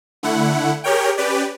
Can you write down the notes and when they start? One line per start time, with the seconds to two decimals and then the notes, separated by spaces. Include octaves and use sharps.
0.23 D3 A3 E4 F#5
0.84 G4 G#4 A#4 C#5 G5
1.17 C#4 G4 B4 D5